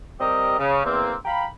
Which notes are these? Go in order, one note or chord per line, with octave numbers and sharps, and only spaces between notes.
G3 C4 G4 A#4 D#5
C#3
E2 A#3 C4
F5 G5 A#5 B5